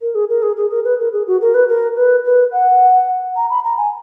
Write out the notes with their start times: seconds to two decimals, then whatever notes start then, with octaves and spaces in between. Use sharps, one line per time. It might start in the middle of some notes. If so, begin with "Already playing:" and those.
0.02 A#4
0.15 G#4
0.30 A#4
0.42 G#4
0.56 G#4
0.71 A#4
0.85 B4
0.99 A#4
1.13 G#4
1.27 F#4
1.41 A#4
1.54 B4
1.68 A#4
1.96 B4
2.25 B4
2.52 F#5
3.36 A#5
3.50 B5
3.64 A#5
3.78 G#5